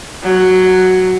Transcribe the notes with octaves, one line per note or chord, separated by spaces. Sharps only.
F#3